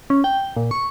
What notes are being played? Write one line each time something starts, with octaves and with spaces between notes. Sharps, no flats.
C#4
G5
A#2
C#6